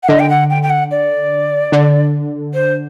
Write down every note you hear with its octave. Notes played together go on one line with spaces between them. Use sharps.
F#5
D3 D#5
G5
F#5
G5
G5
F#5
D5
D3
C5